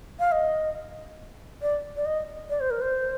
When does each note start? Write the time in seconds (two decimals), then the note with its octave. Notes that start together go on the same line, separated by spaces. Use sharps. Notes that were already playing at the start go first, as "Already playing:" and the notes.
0.20 F5
0.32 D#5
1.62 D5
1.96 D5
2.06 D#5
2.50 D5
2.60 C5
2.71 A#4
2.81 C5